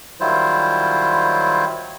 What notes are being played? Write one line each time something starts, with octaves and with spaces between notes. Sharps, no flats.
D#3 F#3 G3 E4 F4 C5